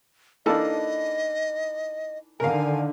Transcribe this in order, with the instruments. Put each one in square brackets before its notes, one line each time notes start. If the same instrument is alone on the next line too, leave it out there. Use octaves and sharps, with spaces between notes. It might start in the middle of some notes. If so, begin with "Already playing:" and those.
[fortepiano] E3 A#3 D4 [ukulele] D#4 A4 A5 [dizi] D#5
[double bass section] D3 D#3 [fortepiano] A#4 F5 [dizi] G#5